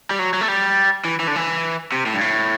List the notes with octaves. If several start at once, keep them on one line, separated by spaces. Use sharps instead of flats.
G3
F#3
F#3
A3
G3
E3
E3
D3
E3
C3
A2
G2
A2